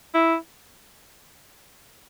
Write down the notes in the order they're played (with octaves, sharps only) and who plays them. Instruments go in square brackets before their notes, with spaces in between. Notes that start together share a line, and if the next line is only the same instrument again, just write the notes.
[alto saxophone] E4